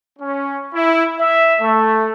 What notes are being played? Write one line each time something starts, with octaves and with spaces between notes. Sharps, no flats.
C#4
E4
E5
A3